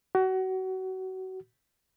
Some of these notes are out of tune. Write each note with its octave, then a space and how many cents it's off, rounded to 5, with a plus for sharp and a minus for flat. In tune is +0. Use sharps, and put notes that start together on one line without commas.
F#4 +25